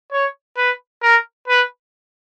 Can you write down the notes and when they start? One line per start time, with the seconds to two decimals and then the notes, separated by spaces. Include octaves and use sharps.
0.12 C#5
0.57 B4
1.02 A#4
1.48 B4